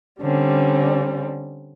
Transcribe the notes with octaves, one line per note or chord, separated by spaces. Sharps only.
D3 G3 C4 C#4